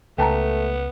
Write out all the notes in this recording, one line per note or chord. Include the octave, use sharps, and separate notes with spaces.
C#2 A3 B3 G5 A5 A#5